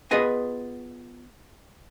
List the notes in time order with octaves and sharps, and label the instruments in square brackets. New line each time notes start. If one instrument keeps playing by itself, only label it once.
[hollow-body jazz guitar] B3 F4 G#4 B4 D#5 G#5